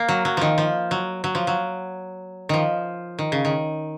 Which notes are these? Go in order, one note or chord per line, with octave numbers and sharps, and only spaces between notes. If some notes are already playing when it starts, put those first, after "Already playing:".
Already playing: A#3
F#3
F#3
D#3 F3
F3
F#3
F#3
F3
F#3
D#3 F3
D#3
C#3
D#3